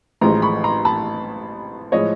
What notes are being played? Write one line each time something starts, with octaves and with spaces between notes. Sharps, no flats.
A1 A2 F3 G#3 A#5 C6
B5 C#6
A#5 C6
A5 B5
A2 F3 G#3 C#5 D#5